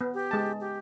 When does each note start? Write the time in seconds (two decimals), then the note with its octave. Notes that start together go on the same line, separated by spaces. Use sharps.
0.01 B3
0.14 G4
0.31 G#3 A5
0.61 G4